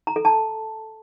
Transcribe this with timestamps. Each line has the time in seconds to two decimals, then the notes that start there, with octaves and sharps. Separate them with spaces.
0.07 A#5
0.16 A4
0.25 A5